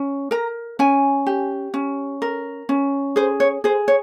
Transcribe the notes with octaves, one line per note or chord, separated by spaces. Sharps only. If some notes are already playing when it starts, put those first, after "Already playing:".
Already playing: C#4
A#4 A#5
C#4 G#5
G4
C#4
A#4
C#4
G#4 C5
C#5
G#4 C5
C#5